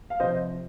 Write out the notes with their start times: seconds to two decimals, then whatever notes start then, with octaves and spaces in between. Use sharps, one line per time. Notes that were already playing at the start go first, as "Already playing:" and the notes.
0.10 F5
0.20 C3 F3 C5 D#5